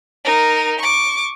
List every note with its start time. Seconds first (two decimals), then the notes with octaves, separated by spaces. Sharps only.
0.24 D#4 A#4
0.79 C#6 D6